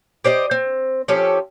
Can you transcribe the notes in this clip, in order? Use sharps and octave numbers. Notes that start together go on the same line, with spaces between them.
G4 C5 D5 D#5
C4
F3 C#4 G4 A4